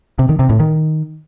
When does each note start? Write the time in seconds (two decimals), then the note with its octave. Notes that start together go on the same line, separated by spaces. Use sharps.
0.19 C3
0.29 D#3
0.39 C3
0.49 A2
0.60 D#3